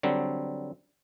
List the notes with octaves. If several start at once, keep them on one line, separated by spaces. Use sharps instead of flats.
D3 F#3 G3 C4